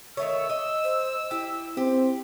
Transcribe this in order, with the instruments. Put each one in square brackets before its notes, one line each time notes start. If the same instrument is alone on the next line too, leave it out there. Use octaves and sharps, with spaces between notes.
[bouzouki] D#3 A3 C#5 [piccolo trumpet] E6
[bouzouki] D#5
[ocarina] C5
[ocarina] E4 [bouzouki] G4
[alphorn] C4 [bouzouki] G4